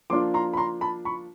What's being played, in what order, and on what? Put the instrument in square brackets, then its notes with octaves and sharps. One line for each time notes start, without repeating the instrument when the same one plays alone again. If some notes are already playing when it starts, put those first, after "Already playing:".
[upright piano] F3 A#3 D4 F4 C6 D6
A#5 C6
B5
A#5 C6
A5 B5
B5 C#6